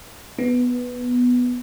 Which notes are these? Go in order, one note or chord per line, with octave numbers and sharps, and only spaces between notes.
B3